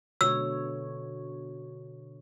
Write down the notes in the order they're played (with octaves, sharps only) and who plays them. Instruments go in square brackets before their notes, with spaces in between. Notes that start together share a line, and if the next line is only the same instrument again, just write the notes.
[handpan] B2 D3 C#5 [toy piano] E6